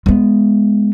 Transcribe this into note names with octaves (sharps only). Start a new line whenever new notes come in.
G#3 B3